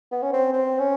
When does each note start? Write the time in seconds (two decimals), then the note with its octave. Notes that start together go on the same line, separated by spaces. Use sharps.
0.12 B3
0.22 C#4
0.33 C4
0.53 C4
0.79 C#4